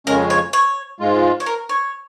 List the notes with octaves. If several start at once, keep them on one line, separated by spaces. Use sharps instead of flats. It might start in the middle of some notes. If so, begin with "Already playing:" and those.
F2 C#3 G#3 C#4 A#4
C#5
C#5
G#2 G#3 F4
C#5
A#4
C#5